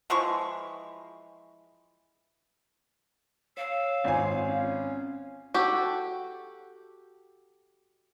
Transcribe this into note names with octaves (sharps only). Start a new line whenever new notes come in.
E3 F3 G#3 C#6
C#5 F5 E6
G#1 F4 G#5
C#4
F#4 G4 A4